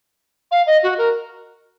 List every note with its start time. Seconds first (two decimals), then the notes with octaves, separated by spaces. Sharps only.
0.51 F5
0.66 D#5
0.83 F#4
0.98 A#4